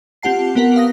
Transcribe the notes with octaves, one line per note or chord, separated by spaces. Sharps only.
C4 F4 G4 F#5 A5 C7
B3 G4 A#4 B4 F#5
F5 D#6 A#6